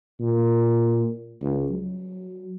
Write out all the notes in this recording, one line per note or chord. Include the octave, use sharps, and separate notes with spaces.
A#2
C#2
F#3